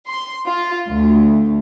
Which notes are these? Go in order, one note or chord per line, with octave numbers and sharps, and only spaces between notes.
C6
F4
D2